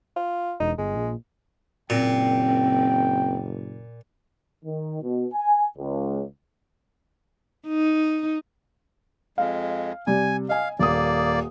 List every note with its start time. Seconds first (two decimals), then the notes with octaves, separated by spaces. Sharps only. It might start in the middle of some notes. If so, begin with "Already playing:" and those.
0.17 F4
0.60 E1 D#4
0.79 G1 G#3
0.96 A#1
1.90 F#1 A#2 C4 G5
4.64 D#3
5.02 B2
5.34 G#5
5.77 C#2
7.67 D#4
9.38 F2 G#3 F5
10.07 C3 G3 G#5
10.49 D#5 F5 G#5
10.79 D#1 A#3 D5 D#6